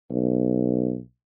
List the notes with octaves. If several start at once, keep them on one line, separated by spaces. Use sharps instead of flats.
B1